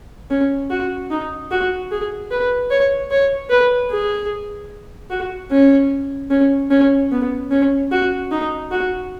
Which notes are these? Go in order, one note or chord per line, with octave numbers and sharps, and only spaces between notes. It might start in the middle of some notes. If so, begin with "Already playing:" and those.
C#4
F#4
D#4
F#4
G#4
B4
C#5
C#5
B4
G#4
F#4
C#4
C#4
C#4
B3
C#4
F#4
D#4
F#4